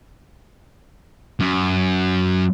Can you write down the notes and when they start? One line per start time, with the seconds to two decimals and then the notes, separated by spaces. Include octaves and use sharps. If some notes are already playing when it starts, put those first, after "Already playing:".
1.40 F#2